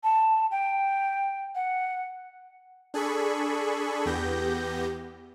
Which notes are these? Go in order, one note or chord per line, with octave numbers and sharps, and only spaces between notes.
A5
G5
F#5
D4 G#4 A4 B5 C#6
E2 B3 G4 G6 A#6